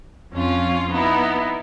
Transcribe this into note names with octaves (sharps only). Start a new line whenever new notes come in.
F2 C#4 F4 F5
B3 D#4 E4